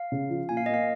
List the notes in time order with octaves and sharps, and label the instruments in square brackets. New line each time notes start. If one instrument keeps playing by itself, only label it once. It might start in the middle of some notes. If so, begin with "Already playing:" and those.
Already playing: [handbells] F5
[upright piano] C#3
F3
[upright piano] A#2 [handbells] G#5
[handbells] F5
[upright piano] A#3 [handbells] D#5
[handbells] F5